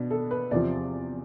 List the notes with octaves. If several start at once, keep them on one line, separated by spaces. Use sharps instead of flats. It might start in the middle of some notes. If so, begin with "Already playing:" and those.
Already playing: B2 B3 D4
A4
B4
E2 C3 F3 C4 F4 D5